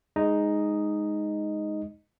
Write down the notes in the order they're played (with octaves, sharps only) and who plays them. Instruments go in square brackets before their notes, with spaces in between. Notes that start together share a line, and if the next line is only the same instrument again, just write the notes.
[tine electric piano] G#3 D#4 D#5